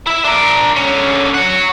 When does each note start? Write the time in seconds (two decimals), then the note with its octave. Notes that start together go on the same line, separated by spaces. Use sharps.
0.07 E4 E5
0.25 D4 A#4
0.76 D3 C#4
1.34 C#5 F#5